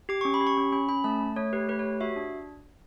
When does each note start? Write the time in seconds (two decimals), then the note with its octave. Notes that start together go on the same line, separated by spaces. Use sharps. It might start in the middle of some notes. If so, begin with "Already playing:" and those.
0.09 G4 D6
0.21 C#4 C#6
0.34 B5
0.41 G4
0.47 C#6
0.57 C#4
0.72 C#4 B5
0.89 C#4 B5
1.04 A3 A5
1.21 A3
1.36 A3 C#5
1.53 G4 B4
1.68 A3 B4
1.79 C#5
1.84 G4
2.01 F#4 E5
2.16 D4